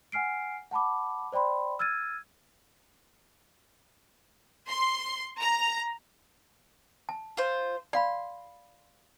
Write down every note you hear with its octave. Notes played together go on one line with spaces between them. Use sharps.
F#5 G#5 F6 C7 D7
F#5 A5 B5 D6
C5 D5 G5 B5 C6
E6 F6 G#6 A6 D#7
C6
A#5
A5
F4 C5
D5 F5 B5 C6